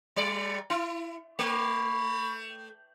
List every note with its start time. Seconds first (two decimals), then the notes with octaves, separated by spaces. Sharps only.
0.16 G3 D5
0.70 E4
1.39 A3 B5 C#6